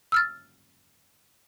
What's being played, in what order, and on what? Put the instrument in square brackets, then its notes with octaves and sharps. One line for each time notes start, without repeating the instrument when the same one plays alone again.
[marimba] E6 F6 A6